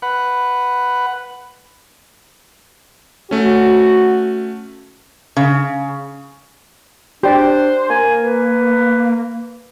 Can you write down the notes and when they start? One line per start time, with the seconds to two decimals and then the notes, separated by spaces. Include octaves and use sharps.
0.02 B4 F#5
3.31 A3 C#4 F#4
5.37 C#3
7.23 D4 G4 C5 D5
7.90 A#3 G#5
8.21 B4